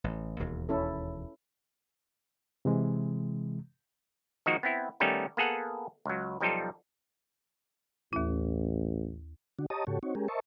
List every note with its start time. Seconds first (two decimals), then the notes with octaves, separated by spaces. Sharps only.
0.04 A1
0.39 E1 D#2
0.69 C#4 E4 A4
2.65 C3 E3 G#3
4.46 D#3 F3 G#3 A#3 D#4 F#4
4.63 B3 C4 E4
5.00 D#3 G3 A3 B3 C#4 D#4
5.37 A#3 B3 G#4 A4 F#5
6.06 C#2 F#3
6.40 B1 F3 G3 D#4 F4 A4
8.13 A1 D#2 E4
9.59 D3 D4 F#4
9.70 G4 C#5 D#5 A5 A#5 D#6
9.87 G#2 C#3 F#4 G4 A4 C#5
10.03 C4 D#4 F#4 C#5
10.15 G#3 C#4 G4 G#4 A#4
10.28 A#4 C5 D#5 E5 A5 C#6